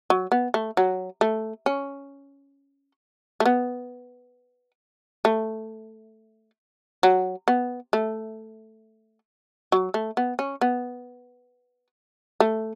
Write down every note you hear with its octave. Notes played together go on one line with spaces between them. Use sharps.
F#3
B3
A3
F#3
A3
C#4
A3
B3
A3
F#3
B3
A3
F#3
A3
B3
C#4
B3
A3